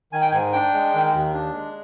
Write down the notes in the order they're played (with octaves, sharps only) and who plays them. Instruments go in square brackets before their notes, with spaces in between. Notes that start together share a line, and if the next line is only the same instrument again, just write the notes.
[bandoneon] D#3 G#5
G5
G#2 G#5
D4 G5
G#3
D#3
D#2
D4
G#3